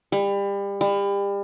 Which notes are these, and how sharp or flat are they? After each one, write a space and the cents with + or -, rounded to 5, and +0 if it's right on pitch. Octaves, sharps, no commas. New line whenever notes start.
G3 +30
G3 +35